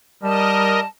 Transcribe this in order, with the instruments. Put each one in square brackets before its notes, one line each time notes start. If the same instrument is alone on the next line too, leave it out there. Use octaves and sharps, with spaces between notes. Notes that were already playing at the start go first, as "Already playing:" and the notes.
[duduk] G3 [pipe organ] A#4 D#5 [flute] A5